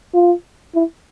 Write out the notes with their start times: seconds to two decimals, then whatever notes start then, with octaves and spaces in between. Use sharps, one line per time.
0.14 F4
0.75 E4